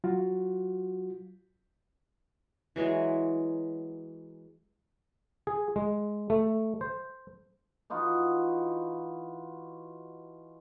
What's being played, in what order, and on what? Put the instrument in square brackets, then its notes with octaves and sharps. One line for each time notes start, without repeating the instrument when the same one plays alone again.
[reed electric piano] F#3 F4 F#4
[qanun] E3 F#3 G#3 C#5
[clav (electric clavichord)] G#4
G#3
A3
C5
[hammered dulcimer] E3 D#4 F4 F#4